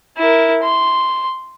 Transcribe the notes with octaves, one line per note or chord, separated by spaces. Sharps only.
E4 A#4
C6